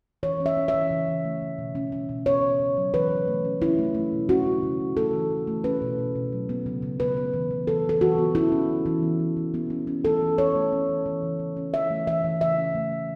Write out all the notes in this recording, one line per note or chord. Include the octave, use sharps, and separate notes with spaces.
E3 C#5
C#4
E5
C#4
E5
E3
C#3
E3
A3
C#3
B2
C#4
C#4
B2
B3 C#5
C#3
C#3
F#3
E3 B4
E3
A3
C#4
C#4 E4
A3
A3
B2
C#4 F#4
C#3
C#3
C#3
A3 A4
E3
E3
A3
C#4 B4
B2
B2
B2
F#3
B3
C#3
C#3
B3 B4
B3
E3
E3
B3 A4
E3 A4
E3 F#4
B3
C#4 E4
C#4
E3
E3
B3
E3
E3
B3
C#4
C#4
E3 A4
E3
E3 C#5
A3
C#4
E3
E3
C#3
E3
C#4
E3 E5
A3
E3 E5
E3
C#3 E5
C#4
A3
A3